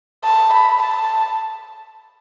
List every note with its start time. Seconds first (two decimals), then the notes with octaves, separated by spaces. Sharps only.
0.24 A5
0.53 B5
0.82 A5